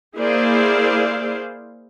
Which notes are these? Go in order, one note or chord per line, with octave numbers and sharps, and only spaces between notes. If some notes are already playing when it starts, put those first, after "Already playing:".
A#3 E4 G#4 C5 D5 F5